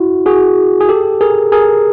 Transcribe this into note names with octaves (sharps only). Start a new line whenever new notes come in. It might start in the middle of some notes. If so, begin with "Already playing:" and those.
Already playing: E4 F#4
F#4 G#4
G#4
G4 A4
G#4 A#4
G#4 A#4